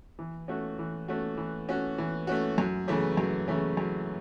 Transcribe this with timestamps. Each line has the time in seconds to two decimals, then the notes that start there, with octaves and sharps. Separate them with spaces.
0.19 E3
0.48 A3 C#4 F#4
0.79 E3
1.08 A3 C#4 F#4
1.37 E3
1.68 A3 C#4 F#4
1.98 E3
2.27 A3 C#4 F#4
2.58 F#2
2.88 C#3 E3 A3 C#4
3.17 F#2
3.48 C#3 E3 A3 C#4
3.77 F#2